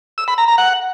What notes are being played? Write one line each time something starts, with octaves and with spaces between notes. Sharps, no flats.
E6
B5
A#5
A#5
F#5